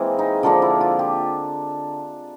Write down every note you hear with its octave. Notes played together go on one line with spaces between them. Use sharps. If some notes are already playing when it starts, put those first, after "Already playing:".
Already playing: E3 G#3 A#3 C4 G#4
D#4
D3 F3 A#3 D4 D#4
E4
F4
G4